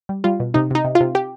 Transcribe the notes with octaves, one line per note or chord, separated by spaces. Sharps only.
G3
G3 F4
B2
C3 D#4
C3 D#4
C3
F4
C3
G4